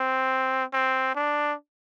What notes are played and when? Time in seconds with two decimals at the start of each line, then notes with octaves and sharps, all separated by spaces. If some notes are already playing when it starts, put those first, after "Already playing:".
Already playing: C4
0.73 C4
1.15 D4